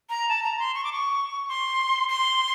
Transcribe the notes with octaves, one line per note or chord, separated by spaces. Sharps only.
A#5
A5
A#5
C6
C#6
D6
C#6
C6
C6